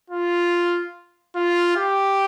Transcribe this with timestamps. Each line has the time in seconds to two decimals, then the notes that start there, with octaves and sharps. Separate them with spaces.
0.10 F4
1.35 F4
1.77 G4